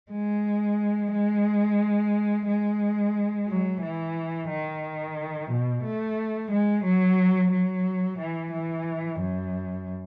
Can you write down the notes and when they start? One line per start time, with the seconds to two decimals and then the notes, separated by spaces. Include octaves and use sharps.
0.12 G#3
1.12 G#3
2.47 G#3
3.48 F#3
3.82 E3
4.49 D#3
5.50 B2
5.83 A3
6.51 G#3
6.84 F#3
7.51 F#3
8.18 E3
8.52 E3
9.20 F#2